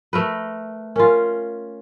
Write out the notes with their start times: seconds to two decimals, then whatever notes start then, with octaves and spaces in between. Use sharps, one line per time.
0.13 A3 A#4 B4
0.96 C#4 F4 A#4 G#5 C6